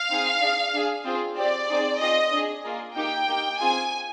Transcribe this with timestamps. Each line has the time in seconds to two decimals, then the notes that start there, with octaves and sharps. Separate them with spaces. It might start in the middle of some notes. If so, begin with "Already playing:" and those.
Already playing: F5
0.10 C4 D#4 G#4
0.41 D4 G#4
0.73 D4 G#4
1.05 C4 F4 G#4
1.37 C4 G4 D5
1.68 C4 D#4 G#4
2.00 C4 F4 G#4 D#5
2.32 D4 G#4
2.63 A#3 F4 G#4
2.95 A#3 D#4 G4 G5
3.27 A#3 D#4 G4
3.59 C4 F4 G#4 G#5